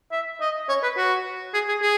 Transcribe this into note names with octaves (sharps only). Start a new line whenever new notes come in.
E5
D#5
C#5
B4
F#4
G#4
G#4
G#4